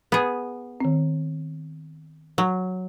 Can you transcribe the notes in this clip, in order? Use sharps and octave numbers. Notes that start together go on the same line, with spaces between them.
B3 G#4
D#3 C4
F#3